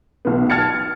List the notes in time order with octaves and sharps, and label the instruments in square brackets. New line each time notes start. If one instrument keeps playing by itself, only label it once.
[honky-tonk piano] B1 B3
A5 F6 G#6 A6 C#7